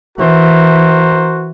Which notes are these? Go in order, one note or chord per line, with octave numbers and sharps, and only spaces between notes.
E3 F#4 A#4 C5